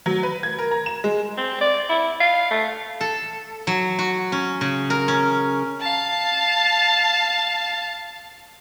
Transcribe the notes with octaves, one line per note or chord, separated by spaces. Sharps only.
F#3
B4
G#6
A#4
A#5
E7
G#3
C4
D5
E4
F5
A3
A4
F#3
F#4
C#4
C#3
A#4
C#4
F5 A5